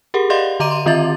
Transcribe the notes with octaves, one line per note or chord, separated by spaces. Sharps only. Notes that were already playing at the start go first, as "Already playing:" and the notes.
G4 G#4 A#4 F#5
G4 D5 D#5 F5 F#5 C6
D3 D#5 A#5 D6 D#7
C6
D#3 C4 F4 D#5 E5 A6